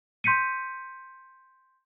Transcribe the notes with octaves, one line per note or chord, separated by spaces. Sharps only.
C6 G6 B6 C#7 D#7